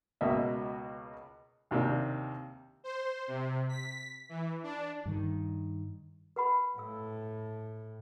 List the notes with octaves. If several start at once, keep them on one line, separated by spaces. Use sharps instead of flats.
C#2 B2 A#3 D#5 E5
D#2 C3 A#3 D4
C5
C3
B6
E3
D4
G2 D#3
B4 F#5 B5
A2 F5 E6